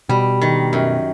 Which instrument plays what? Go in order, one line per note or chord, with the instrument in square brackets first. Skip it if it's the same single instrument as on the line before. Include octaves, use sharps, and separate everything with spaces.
[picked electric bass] B2 [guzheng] G3
[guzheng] D#3
F#2